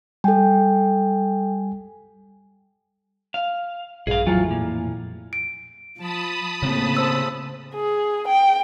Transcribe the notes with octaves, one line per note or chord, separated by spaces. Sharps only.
G3 A4 G5 G#5
F5
A#1 G2 G#4 F5
F2 A2 E3 F#3 F4
A#2
D7
F3 A5 B5 D#6
A2 C#3 A#3 C4
C5 E6
G#4
G5